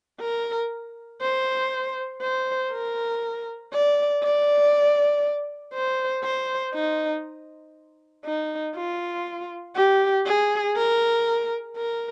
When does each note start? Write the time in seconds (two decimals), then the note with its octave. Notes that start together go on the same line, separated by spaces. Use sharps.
0.21 A#4
1.21 C5
2.22 C5
2.72 A#4
3.73 D5
4.23 D5
5.74 C5
6.24 C5
6.74 D#4
8.25 D#4
8.76 F4
9.76 G4
10.26 G#4
10.76 A#4
11.77 A#4